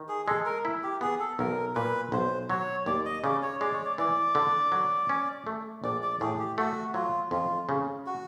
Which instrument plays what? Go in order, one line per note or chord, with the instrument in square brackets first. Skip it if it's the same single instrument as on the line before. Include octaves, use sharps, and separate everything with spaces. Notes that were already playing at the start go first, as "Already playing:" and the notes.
Already playing: [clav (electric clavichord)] D#3
[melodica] G#4
[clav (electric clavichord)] G#3 [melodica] A4
[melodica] A#4
[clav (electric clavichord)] E4
[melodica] G4
[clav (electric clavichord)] B3 [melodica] G#4
[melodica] A4
[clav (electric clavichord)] B1 [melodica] A#4
[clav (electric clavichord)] A#2 [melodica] B4
[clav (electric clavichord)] B1 [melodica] C5
[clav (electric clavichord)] F#3 [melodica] C#5
[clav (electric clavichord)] D#2 [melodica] D5
[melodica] D#5
[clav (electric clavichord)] C#3 [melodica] D5
[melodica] C#5
[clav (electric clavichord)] G#3 [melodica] D5
[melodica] C#5
D5
[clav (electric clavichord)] E3 [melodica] D5
[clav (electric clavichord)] D3
F#3
C#4
A3
[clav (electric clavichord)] A#1 [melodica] D5
[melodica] D5
[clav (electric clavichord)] A2 [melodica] G#4
[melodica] G4
[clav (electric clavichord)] A3 [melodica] F#4
[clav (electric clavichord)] F#3 [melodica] F4
[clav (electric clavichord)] F2 [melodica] F4
[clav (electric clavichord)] C#3
[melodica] F#4